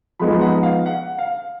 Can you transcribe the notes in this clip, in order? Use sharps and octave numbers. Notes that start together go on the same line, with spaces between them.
F3 G#3 B3 D#4 B5
F#5
F5
F#5
F5